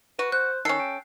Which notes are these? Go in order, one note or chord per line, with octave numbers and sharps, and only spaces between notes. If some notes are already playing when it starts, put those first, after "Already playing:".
F#4 B4
C5 F#6
D#3 C#4 A4 C7
G5